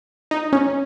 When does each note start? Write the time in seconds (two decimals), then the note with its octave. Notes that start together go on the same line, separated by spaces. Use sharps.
0.31 D#4
0.53 C#4